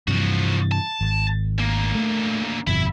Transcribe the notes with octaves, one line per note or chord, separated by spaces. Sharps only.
G2 C3 E3 F3 F#4
A5
G#1
D2 A#3
A3
G1 F2 B2 E5 B5